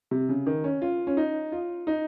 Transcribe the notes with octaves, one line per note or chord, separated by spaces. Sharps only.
C3
C#3
D#3
C#4
F4
C#4
D#4
F4
D#4